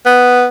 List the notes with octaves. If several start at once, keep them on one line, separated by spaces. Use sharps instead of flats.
B3